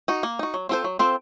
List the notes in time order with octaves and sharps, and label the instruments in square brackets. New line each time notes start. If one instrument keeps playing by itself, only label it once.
[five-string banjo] D#4 F#4
A#3
D#4 F#4
F#3
C4 F4 A4 C5
F#3
C4 F4 A4 C5